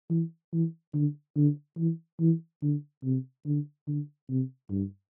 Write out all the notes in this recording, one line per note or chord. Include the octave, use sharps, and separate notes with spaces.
E3
E3
D3
D3
E3
E3
D3
C3
D3
D3
C3
G2